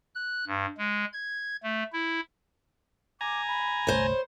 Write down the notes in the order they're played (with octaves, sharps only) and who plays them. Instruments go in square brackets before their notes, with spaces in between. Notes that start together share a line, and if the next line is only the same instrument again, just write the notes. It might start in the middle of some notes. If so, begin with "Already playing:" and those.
[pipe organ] F#6
G2
G#3
G#6
A3
E4
[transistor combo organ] G#5 A#5 [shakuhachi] D6
[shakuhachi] B5
[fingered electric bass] G1 C2 A3 [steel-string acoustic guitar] C5 C#5